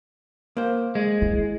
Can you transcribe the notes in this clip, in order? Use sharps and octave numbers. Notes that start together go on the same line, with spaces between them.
A#3 C5
G#3
E4